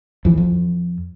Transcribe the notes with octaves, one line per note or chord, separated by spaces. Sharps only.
F2 E3
F2